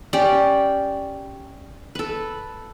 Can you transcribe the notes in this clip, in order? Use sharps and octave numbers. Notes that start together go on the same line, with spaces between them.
C#4 G4 D5
A4 B4